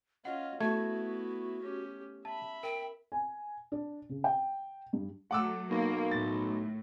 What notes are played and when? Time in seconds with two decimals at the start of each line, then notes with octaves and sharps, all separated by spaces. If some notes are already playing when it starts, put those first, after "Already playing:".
0.25 C#4 F4 D#5 F#5
0.60 A3 B3 E4 F#4 G#6
1.62 C#4 G4
2.25 E5 A5 B5
2.63 A#4 G5
3.12 G#5
3.72 D4
4.09 C#3
4.24 G5
4.93 G2
5.31 F#3 A3 F#5 D6 E6
5.71 B1 A#3
6.11 A2 A6